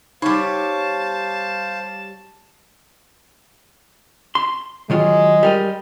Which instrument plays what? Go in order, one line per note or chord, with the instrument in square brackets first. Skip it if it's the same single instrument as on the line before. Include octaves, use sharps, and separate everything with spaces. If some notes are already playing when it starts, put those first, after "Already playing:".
[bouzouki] G3 C#5 [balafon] D#4 [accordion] C5 F5 [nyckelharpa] A5
[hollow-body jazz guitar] C6
[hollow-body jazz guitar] D#3 F#3 F4 [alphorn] G#3
[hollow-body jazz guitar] G3 A#4 D#5